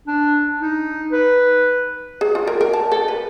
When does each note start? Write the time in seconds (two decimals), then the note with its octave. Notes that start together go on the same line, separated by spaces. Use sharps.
0.07 D4
0.62 D#4
1.12 B4
2.21 G#4
2.35 F4
2.47 A#4
2.61 A#4
2.73 A5
2.92 A4
3.08 B4